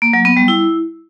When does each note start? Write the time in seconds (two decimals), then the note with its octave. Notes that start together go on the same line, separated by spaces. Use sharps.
0.02 A#3
0.13 F#3
0.25 B3
0.37 G3
0.48 E4